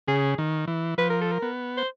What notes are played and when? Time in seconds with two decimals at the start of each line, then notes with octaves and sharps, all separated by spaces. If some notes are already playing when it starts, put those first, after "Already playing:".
0.08 C#3 G#4
0.38 D#3
0.67 E3
0.98 F3 B4
1.10 A#4
1.21 A4
1.32 A#4
1.42 B3
1.77 C5